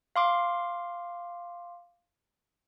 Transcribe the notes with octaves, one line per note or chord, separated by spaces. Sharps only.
F5 C6 D6